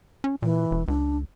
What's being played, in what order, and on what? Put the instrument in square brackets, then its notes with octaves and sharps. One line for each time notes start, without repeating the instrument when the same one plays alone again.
[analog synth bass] C#4
[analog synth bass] A#2 [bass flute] E3
[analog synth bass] E1
[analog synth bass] C#2 [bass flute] D4